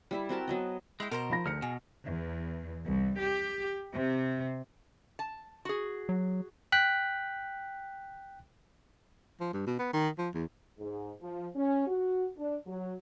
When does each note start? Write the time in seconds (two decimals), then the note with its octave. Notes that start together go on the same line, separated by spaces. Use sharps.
0.11 G3 E4 E5
0.29 C4 F#4 A#4 A5
0.48 F#3 B3 D#5
1.00 G#3 E4 G5
1.11 B2 A#4 C5 A#5
1.30 F3 B5 A#6
1.46 D2 F6 C#7
1.62 B2 G#4
2.05 E2
2.86 C2
3.21 G4
3.93 C3
5.19 A5
5.65 F#4 G#4
6.09 F#3
6.72 G5 F#6 B6
9.40 F3
9.53 G2
9.67 B2
9.79 B3
9.93 D#3
10.18 F3
10.34 E2
10.79 G#2
11.21 F3
11.56 C#4
11.87 F#4
12.37 D4
12.67 F#3